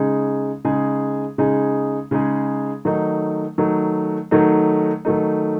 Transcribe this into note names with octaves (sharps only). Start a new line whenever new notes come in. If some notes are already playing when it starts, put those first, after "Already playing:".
Already playing: C#3 G#3 D#4 G#4
C#3 G#3 D#4 G#4
C#3 G#3 D#4 G#4
C#3 G#3 D#4 G#4
D#3 F#3 A3 D#4
D#3 F#3 A3 D#4
D#3 F#3 A3 D#4
D#3 F#3 A3 D#4